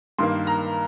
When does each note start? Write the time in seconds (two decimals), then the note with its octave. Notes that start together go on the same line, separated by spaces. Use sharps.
0.18 G2 D#3 A#3 C6
0.47 A#5